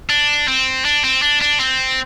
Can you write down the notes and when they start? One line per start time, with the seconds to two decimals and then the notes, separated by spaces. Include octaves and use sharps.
0.10 D4
0.48 C4
0.85 D4
1.04 C4
1.22 D4
1.41 D4
1.60 C4